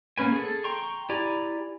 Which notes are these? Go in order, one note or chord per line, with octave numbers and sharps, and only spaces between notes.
A#3 B3 C#4 B4 G#5
G#4 A4
G5 A#5 C6 C#6
E4 G4 D5 G#5 A#5